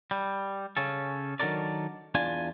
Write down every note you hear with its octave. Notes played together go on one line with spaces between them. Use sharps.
G3
C#3 C#4 A4
D#3 F#3 D4 A4 A#4 D5
E2 D4 F4 G#5